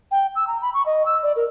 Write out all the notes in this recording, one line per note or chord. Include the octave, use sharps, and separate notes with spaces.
G5
E6
A#5
B5
C#6
D#5
E6
D5
A#4